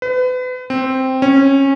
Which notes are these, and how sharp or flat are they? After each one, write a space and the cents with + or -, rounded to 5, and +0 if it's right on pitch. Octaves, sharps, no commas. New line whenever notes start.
B4 +35
C4 +0
C#4 -20